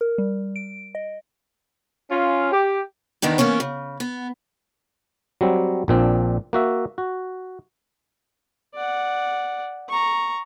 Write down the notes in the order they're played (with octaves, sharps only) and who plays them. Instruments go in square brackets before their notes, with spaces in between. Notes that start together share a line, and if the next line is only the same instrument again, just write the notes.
[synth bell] A#4
G3
D7
D#5
[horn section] C#4 F4
G4
[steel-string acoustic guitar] E2 D#3 B3 D4 D#4
E3 A#3 B3 C#4 C#5
C#3
B3
[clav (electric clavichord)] F#3 G3 C4
A#1 A#2 C4 D4
A#3 F#4 E5
F#4
[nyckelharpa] D5 F#5
A#5 C#6